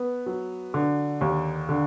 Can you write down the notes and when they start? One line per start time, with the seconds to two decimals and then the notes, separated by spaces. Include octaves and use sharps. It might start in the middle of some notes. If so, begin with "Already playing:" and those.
Already playing: B3
0.26 F#3
0.74 D3
1.21 D#2
1.69 D3